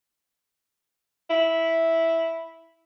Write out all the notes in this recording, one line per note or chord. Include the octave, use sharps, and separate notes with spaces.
E4